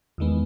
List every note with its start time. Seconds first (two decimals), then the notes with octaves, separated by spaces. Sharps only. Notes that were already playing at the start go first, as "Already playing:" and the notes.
0.18 E2 D#3 G#3 B3